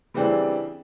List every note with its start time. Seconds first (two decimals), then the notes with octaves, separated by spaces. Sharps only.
0.14 C#3 E3 G3 C4 D4